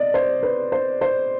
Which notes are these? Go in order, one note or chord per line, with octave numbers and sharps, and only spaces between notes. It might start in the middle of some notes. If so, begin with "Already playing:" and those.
Already playing: D5 D#5
C5
B4
C5
C5